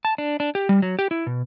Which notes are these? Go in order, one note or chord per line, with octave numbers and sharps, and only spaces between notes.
A5
D4
D4
G4
G3
F#3
G4
E4
B2